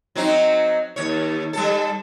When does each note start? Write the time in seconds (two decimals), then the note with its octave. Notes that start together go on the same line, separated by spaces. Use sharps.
0.15 F#3 C4 D#4
0.96 D#2 C#5
1.53 G3 A4